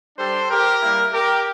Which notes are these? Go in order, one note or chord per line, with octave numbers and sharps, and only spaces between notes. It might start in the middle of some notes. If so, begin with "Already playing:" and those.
G3 D4 G4 A4 C5
G4 A#4
G3 A#3 E4 G4
G4 A#4